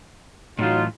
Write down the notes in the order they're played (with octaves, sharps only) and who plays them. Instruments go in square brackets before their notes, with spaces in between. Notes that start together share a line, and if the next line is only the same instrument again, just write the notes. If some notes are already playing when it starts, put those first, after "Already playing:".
[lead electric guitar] A2 E3 [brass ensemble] F#3 D#4 F4